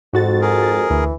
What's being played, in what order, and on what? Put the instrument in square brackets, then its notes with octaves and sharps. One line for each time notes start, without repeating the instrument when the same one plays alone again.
[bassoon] F2 [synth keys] G#2 F#4 A6
[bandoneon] G#4 A#4
[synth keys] D2 [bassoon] E3